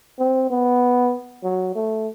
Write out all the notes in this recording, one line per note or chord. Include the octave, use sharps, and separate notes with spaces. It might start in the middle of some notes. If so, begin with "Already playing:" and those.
C4
B3
F#3
A3